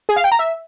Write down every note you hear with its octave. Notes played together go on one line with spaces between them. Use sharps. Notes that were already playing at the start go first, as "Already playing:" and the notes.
G#4
F5
G5
A#5
E5